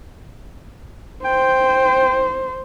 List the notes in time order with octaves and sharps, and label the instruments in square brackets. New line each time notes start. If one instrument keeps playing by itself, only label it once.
[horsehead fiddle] C5 [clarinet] G5